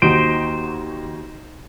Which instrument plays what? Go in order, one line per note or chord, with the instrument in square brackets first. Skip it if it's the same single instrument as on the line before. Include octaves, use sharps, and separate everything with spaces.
[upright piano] D#2 F#4 D7 [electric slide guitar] D#4 C5